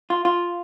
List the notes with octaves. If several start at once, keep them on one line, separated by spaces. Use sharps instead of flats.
F4
F4